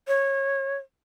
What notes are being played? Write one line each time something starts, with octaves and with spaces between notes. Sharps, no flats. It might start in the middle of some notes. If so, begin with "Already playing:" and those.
C#5